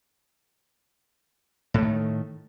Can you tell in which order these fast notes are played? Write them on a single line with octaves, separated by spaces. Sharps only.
A2 A3 D#3